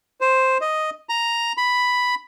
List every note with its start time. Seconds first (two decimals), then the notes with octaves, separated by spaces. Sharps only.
0.21 C5
0.61 D#5
1.09 A#5
1.57 B5